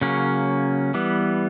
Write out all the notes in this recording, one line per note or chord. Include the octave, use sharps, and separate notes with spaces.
C#3 F#3 A#3 C#4
E3 G3 B3